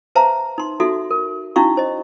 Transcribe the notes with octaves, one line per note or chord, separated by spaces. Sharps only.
B4 C5 E5 F5 A5 A#5
D#4 C6
D#4 F#4 A4 E5
A#4
C#4 D#4 E4 F#4 F5 C#6
C5 D#5